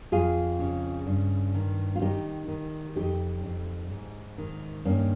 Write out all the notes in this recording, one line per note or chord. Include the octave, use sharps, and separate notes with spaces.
F2 F4 G#4
C#3
G2
D#3
F4
D#3 D#4 G4
D#3
F2 D#4 G4
F2
G#2
D#3
G2 A#3 C#4